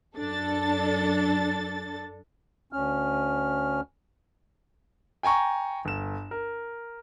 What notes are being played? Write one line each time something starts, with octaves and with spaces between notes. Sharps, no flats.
F#2 D4 A4 A6
D2 C#4 F6
G5 G#5 A#5 C#6
G1 E7
A#4